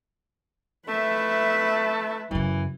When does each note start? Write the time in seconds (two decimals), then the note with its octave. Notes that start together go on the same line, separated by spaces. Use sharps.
0.88 A3 B4 E5
2.31 F#2 C#3 E3